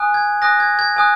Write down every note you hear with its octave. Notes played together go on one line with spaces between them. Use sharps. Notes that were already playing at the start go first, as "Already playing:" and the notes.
Already playing: G#5 D#6 F#6
G#6
G#5 D#6 F#6 A#6
G#6
G#6
G#5 D#6 F#6